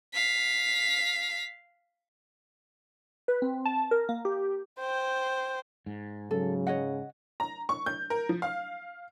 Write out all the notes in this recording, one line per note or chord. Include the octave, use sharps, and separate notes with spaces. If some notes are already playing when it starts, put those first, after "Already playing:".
F5 B6
B4
C4
A5
A#4
A#3
G4
C5 G5
G#2
C#3 F#3 A4
C#5 D#5 F#5
A#5
C#6
G6
A#4
F3
F5